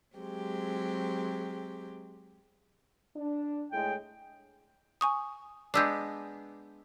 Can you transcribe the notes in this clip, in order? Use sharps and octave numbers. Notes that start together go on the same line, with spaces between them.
F#3 G#3 C4 G4
D4
A2 G#3 G5
G#5 C#6 D#6
G#3 B3 D4 D6 E6 G6